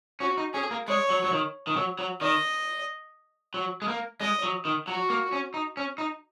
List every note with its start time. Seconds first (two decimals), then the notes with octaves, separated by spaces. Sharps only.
0.20 C#4 F#4
0.38 D#4
0.54 C#4 G#4
0.71 A#3
0.88 G#3 C#5
1.10 F#3
1.24 F#3
1.32 D#3
1.67 D#3
1.76 F#3
1.99 F#3
2.21 D#3 D#5
3.54 F#3
3.82 G#3
3.88 A#3
4.21 G#3 D#5
4.43 F#3
4.65 D#3
4.88 F#3 F#4
5.10 A#3
5.33 C#4
5.54 D#4
5.77 C#4
5.98 D#4